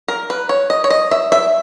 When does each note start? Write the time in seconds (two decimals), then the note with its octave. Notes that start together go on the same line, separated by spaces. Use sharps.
0.08 A#4
0.30 B4
0.49 C#5
0.70 D#5
0.84 C#5
0.90 D#5
1.11 E5
1.32 E5